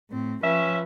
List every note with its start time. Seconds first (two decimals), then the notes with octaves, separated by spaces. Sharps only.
0.11 A2 C4
0.43 F3 C#4 B4 E5